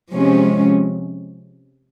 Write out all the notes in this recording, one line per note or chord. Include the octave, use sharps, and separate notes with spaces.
C3 F3 G#3 C#4